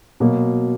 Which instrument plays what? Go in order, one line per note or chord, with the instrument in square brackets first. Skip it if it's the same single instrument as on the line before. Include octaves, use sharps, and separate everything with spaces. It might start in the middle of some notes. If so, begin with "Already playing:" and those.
[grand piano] B2 F#3 A#3